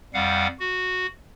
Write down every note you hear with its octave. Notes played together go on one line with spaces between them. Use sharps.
F2 G3 F5 F#5
F#4